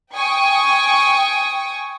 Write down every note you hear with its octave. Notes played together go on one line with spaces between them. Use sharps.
G5 G#5 C#6 D#6